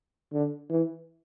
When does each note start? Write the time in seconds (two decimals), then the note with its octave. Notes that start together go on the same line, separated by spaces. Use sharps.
0.33 D3
0.70 E3